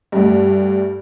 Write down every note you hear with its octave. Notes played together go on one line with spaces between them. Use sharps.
D2 G2